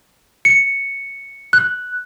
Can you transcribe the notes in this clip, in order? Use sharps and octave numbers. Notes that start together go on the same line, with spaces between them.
C#7
F#6